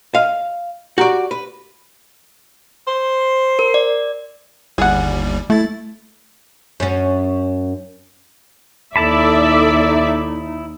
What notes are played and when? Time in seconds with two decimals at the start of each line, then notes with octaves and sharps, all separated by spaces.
0.15 D#5 F5
0.98 F#4 G4 D5 A#5 C#6
1.31 B4
2.87 C5
3.59 A#4
3.74 D5
4.78 G1 D#2 G3 G#4 F#5
5.50 A3 E4 A6
6.80 F#2 C#4
8.96 D#2 D#4 E4 A4 D5 E5 A5 B5